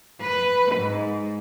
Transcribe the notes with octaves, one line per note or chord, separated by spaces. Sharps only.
B4
G#2